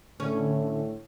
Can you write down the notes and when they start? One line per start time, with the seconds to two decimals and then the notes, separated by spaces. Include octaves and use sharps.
0.20 A2 D3 A3 C#4